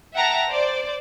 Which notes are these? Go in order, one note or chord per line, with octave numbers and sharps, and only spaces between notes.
E5 F#5 G5 A5 A#5
C5 D5